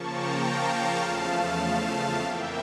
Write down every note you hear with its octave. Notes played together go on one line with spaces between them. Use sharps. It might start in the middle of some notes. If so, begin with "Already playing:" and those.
Already playing: C#3 F3 A#3 A5 C#6
G5 A#5
F5 A5
E2 C#3 F3 A3
F2 E3 A#3 E5 G5